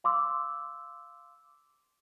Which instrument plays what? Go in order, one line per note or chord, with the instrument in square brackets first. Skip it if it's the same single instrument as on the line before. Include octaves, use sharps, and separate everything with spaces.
[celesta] F5 C6 D6 E6